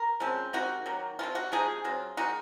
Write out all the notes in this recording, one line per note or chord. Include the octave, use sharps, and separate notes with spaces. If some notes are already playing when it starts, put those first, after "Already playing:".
Already playing: A#4
C#3 F3 G#3 C4
C3 D#3 G#3 C4 F#4
D#3 F#3 A#3
C3 F3 C4 F4
F#4
C3 F3 G#3 D#4 G#4
F#3 C4 F4
D#3 G#3 D#4 F#4